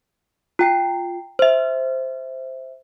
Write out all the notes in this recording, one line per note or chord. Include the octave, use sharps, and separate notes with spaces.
F4 G5 C7
C5 E5